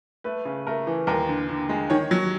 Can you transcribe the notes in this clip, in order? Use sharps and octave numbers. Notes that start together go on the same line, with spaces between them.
A3 B4
C#3
A3 A#4
E3
D#2 A#4
D3
D3
G#3
D#3 C#5
F#3